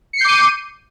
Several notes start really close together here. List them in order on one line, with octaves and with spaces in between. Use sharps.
C#7 C7 G6 D6 D#7